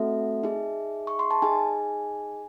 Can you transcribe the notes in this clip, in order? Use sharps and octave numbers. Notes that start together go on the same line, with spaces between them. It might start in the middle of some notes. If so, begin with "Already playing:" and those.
Already playing: A3 C4 F#4 A4 E5
D#4 G#4
C#6
C6
A5
D#4 G#4 G#5